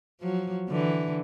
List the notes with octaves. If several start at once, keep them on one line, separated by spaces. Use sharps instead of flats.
F3 F#3
D3 E3